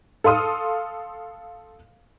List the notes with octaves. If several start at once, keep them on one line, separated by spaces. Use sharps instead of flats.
A4 F5 C6 D#6 F6